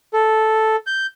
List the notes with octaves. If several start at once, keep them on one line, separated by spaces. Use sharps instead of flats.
A4
G6